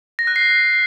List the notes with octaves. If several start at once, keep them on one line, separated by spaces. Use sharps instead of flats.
A#6
F#6
C7